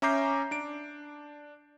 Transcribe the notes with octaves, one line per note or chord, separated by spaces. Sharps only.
C#4 E5 A#5 D6 G6 C7
D4 D7